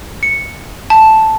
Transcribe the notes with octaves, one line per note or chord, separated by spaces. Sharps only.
C#7
A5